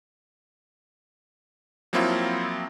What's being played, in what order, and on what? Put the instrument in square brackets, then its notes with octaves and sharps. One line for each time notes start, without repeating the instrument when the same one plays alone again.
[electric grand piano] F3 F#3 A#3 C4 E4 F4